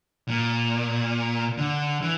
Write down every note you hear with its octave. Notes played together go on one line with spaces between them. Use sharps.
A#2
D3
E3